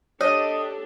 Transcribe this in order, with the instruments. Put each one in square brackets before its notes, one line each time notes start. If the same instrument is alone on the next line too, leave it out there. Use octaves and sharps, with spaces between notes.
[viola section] D4 G4 A4 [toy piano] C#5 [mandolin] D#5